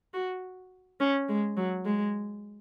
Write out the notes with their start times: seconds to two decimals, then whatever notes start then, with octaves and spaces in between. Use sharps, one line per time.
0.14 F#4
1.00 C#4
1.29 G#3
1.57 F#3
1.85 G#3